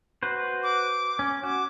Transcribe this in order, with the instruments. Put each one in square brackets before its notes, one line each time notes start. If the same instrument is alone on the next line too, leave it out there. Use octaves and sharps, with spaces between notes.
[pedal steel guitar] F#4 B4 C5
[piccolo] D6
[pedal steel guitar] C#4
[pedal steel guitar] F#4 [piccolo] D6